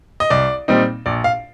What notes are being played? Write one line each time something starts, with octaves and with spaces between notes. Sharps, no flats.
D#5
C2 D5
A#2 G3 C4 D#4
A#1 D5
F5